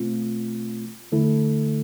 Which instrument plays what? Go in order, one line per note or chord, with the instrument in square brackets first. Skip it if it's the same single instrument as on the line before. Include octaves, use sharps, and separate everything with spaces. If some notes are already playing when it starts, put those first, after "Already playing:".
Already playing: [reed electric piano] B2 A3 C4 F4
E2 D3 A3 E4 A4